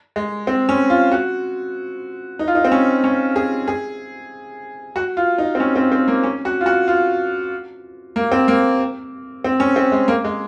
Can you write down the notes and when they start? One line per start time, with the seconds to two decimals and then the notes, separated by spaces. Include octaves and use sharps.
0.16 G#3
0.47 C4
0.69 C#4
0.90 F4
1.11 F#4
2.39 D#4
2.48 F4
2.55 D#4
2.65 C4
2.72 C#4
3.04 C#4
3.36 G#4
3.68 G#4
4.96 F#4
5.17 F4
5.38 D#4
5.55 C4
5.60 C#4
5.76 C4
5.92 C4
6.08 A#3
6.23 C#4
6.45 F#4
6.61 F4
6.66 F#4
6.88 F4
8.16 A#3
8.32 C4
8.48 A#3
9.44 C4
9.60 C#4
9.76 C4
9.92 G#3
10.08 A#3
10.24 G#3